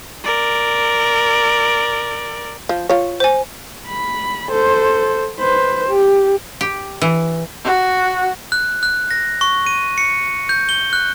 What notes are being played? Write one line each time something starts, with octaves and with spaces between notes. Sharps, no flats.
A#4 D5
F3
F4 C#5
C5 G#5
B5
A4 C5
B4 C5
G4
G4
E3
F#4
F#6
F#6
A#6
C#6
D#7
C#7
G6
G7
F#6